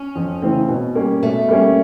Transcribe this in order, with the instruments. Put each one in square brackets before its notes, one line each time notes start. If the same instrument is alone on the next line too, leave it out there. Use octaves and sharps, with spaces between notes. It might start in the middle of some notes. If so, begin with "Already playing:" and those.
Already playing: [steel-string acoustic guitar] C#4
[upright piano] F2
C#3 E3 A3 C4
B2
G3 A#3 C#4
[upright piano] B2 [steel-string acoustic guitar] A3
[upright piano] G3 A#3 C#4